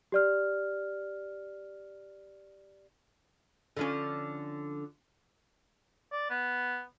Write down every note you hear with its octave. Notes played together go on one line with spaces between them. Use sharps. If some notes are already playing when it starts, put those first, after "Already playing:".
G4 D5 F6
D3 F3 C#4
D5
B3